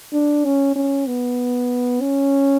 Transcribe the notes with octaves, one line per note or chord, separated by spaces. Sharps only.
D4
C#4
C#4
B3
C#4